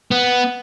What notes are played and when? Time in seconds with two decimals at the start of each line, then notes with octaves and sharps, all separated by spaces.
0.11 B3